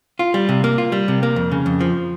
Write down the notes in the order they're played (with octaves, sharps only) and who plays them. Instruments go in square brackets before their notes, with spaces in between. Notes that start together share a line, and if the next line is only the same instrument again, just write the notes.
[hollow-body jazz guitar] F4
G3
C3
A#3
F4
G3
C3
A#3
F2
C#3
F2
F3